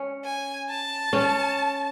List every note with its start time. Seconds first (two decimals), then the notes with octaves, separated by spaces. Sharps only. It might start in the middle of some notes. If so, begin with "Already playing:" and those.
Already playing: C#4
0.25 G#5
0.69 A5
1.13 C#4